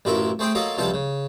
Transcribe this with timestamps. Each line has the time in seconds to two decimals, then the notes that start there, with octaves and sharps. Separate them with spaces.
0.05 A1 F#2 E4 F4 A#4 E5
0.39 A3 C4 G#4 C5 G5
0.55 F#3 A#3 F4 A4 D#5 F5
0.77 C#2 C3 F3 G3 A4 A5
0.94 C#3